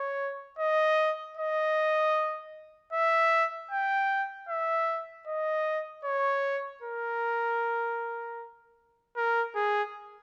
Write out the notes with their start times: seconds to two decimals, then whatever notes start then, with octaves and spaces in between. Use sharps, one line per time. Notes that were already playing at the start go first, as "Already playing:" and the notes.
Already playing: C#5
0.59 D#5
1.37 D#5
2.93 E5
3.71 G5
4.49 E5
5.27 D#5
6.04 C#5
6.83 A#4
9.16 A#4
9.55 G#4